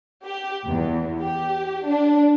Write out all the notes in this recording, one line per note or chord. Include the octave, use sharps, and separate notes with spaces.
G4
E2
G4
D4